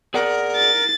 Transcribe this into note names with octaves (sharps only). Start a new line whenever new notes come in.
G#4 A#4 D5 F#5
A6